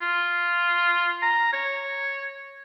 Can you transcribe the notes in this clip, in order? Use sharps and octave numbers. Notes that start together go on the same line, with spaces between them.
F4
A#5
C#5